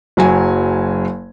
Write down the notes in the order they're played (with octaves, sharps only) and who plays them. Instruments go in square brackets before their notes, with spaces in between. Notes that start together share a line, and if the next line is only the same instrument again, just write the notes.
[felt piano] F#1 F#3 G#5